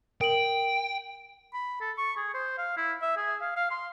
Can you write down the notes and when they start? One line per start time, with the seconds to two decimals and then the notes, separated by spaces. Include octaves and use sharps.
0.21 A#4 G5 D7 F#7
1.54 B5
1.81 A4
1.98 C#6
2.17 G#4
2.34 C5
2.58 F5
2.77 E4
3.02 E5
3.17 G#4
3.41 F5
3.57 F5
3.71 C6